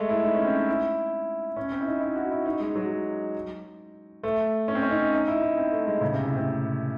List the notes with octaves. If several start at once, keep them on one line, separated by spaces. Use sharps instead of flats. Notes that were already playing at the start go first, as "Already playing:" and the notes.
Already playing: G#3 A3
E4
D#4
C#4
C4
D#4
E4
C#4
C4
E4
D#4
E4
F#4
E4
D#4
G#3
F#3
A3
C#4
C4
C#4
D#4
D#4
E4
D#4
C4
A3
G#3
C#3
C3
A2
C3